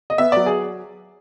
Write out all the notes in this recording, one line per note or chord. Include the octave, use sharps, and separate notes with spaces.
D#5
B3 E5
F#3 D5
G#4